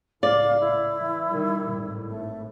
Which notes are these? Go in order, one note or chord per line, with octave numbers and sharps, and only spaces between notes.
C#2 A2 D5 F5
E4
E3
D#3 G3
G#1 A2
A3